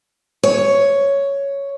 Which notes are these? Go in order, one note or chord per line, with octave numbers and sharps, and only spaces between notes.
C#5